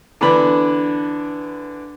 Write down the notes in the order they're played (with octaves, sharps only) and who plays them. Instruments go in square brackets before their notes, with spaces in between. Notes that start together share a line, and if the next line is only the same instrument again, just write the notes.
[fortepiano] D3 E3 B3 D4 B5